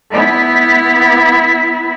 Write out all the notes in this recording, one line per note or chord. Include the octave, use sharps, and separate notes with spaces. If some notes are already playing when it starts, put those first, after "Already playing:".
B3 E4